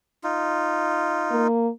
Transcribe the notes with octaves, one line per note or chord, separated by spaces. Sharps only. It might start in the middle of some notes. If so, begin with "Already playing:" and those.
D#4 F4
A#3